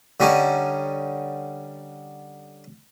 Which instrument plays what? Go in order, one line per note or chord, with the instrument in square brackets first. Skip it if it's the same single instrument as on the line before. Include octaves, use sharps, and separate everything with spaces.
[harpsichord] D3 G3 C#4 D#4